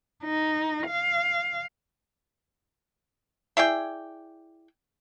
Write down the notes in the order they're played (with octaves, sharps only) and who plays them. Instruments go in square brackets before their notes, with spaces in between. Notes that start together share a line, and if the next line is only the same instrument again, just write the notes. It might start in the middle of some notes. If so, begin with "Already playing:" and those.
[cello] D#4
F5
[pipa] E4 G#4 D5 G5